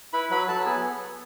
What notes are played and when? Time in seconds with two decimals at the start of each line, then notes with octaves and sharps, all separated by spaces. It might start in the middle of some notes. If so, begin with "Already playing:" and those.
0.13 E4 B4 B5
0.30 F#3 B4 B5
0.48 F#3 A4 A5
0.65 B3 G#4 G#5